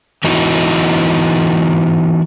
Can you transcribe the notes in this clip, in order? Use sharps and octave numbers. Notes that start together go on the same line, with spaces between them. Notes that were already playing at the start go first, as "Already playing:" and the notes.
E3 B3 D#4 E4 F#4